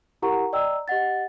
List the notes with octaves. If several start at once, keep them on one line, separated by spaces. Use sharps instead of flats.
E4 G4 A#4 F#5 A#5 C#6
D5 D#5 G5 A#5 E6
G4 D#5 F#5 A6